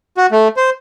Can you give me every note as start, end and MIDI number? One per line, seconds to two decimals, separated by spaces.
0.17 0.26 66
0.32 0.48 57
0.57 0.70 72